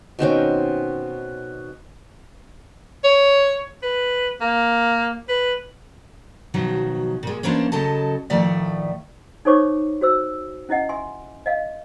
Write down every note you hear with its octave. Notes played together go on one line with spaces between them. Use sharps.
B2 D#3 C4 C#4
C#5
B4
A#3
B4
B2 D#3 F3 F#3
A#2 G#3
E3 A#3 C#4 D4 C5 A5
C#3 F#3 A4 D#5 A5
A2 D#3 F3 A3 D5 E5
D#4 A4 C5 C#5 C#6 D6
F#4 C5 E6
C#4 E4 D#5 F#5
E5 G#5 C6
D#5 F5